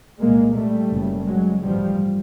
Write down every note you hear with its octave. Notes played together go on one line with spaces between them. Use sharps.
C2 A#2 G#3 A#3
G3 A3
F#1 F#2 C#3
F#3 G#3
A1 G2 F3 G3